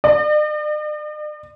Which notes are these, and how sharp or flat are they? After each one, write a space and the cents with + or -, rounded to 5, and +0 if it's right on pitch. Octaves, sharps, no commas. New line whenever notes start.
D5 +45